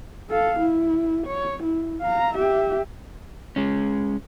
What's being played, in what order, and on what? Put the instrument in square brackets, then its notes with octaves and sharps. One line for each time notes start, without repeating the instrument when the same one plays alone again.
[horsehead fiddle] A4 F5
E4
C#5
E4
F5 A#5
G4 E5
[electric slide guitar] G#3 C#4